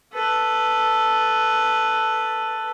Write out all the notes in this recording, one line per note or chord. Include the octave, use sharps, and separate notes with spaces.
A4 B4